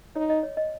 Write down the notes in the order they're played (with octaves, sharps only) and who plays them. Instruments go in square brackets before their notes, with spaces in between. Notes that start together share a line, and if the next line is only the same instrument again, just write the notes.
[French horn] D#4 [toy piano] C#5
[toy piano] D#5
C#5
D#5